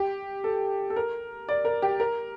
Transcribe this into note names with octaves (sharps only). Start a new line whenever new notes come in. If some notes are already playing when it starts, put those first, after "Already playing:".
Already playing: G4
A4
A4
A#4
D5
A#4
G4
A#4